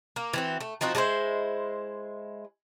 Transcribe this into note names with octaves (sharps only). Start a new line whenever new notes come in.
A#3
E3 C4 F#4
A3
F3 C4 D#4 F#4
G#3 D4 E4 C5